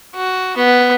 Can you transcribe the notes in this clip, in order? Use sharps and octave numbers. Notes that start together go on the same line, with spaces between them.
F#4
B3